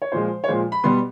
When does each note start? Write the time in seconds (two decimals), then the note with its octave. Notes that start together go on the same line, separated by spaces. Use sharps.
0.02 C#5
0.12 A#2 F3 G#3 C5
0.44 C#5
0.48 A#2 F3 G#3 C5
0.72 B5
0.84 B2 G3 B3 C6